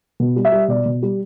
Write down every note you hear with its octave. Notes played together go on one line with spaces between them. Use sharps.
B2
G3
E5
G3
B2 D5
B2
G3